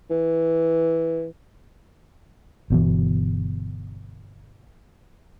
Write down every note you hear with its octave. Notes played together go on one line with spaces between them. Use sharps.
E3
G1 B2 E3